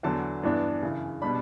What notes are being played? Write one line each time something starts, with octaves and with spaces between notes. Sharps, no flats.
E2 D3 F#3 A5
G2 E3 B3 D4
F#2 C#3 E3
B2 G3 D4 B5